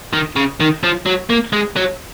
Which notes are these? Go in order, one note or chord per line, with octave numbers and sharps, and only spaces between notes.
D#3
C#3
D#3
F3
F#3
A#3
G#3
F#3